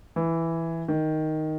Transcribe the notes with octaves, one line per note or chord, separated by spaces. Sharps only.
E3
D#3